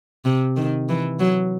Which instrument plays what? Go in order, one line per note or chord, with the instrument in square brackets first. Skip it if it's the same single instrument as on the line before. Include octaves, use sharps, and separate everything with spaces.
[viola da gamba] C3
D#3
E3
F#3